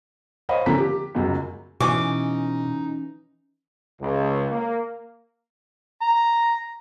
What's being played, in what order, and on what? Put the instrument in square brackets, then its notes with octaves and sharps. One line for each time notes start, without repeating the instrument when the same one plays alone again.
[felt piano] C5 C#5 D#5 F5 B5
D3 F3 A#3 C#4 A#5 B6
G4
F#1 C#2 F#2
[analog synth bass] B2 [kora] E3 C#4 [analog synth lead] D#4 [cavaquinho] D6
[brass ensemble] C#2
A#3
[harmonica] A#5